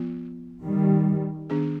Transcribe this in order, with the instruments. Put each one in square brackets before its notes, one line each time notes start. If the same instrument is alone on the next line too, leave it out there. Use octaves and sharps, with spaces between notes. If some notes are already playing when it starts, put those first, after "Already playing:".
Already playing: [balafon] F3 B3 F4
[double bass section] D#3 G3
[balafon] D#3 B3 D4 G#4